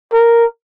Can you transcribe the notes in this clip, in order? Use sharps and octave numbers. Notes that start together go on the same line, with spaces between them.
A#4